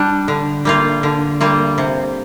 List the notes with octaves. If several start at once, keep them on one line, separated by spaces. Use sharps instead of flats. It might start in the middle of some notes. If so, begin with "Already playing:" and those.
Already playing: G3 D4
D3
G3 A#3 F4
D3
G3 A#3 F4
C3